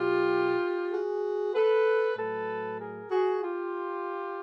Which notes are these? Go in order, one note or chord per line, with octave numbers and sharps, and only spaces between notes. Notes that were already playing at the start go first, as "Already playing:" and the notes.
Already playing: B2 F#3 F4 G4
F#4 G#4
A4 B4
A2 F#3 A4 B4
G#4 A#4
F#4 G#4
F4 G4